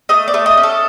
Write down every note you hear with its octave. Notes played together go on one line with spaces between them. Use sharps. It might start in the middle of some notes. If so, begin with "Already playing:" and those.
A3 D#5
D5
A3
D#5
C#4
A4